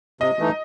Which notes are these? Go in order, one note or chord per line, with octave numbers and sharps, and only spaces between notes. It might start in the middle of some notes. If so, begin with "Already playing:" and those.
C3 D#5
E3 A3 D#4